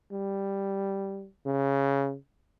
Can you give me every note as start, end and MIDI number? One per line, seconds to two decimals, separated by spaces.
0.11 1.27 55
1.46 2.15 49